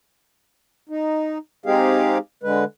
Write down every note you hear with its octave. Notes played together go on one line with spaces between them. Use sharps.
D#4
G#3 C4 D#4 G4 G#4 F5
D3 G#3 B4